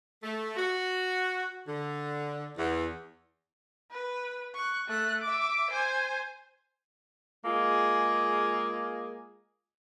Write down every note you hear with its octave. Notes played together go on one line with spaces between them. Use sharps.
A3
F#4
D3
E2
B4
C#6 F#6
A3 F#6
E5 D6
C5 G#5
G#3 A#3 F4 G#4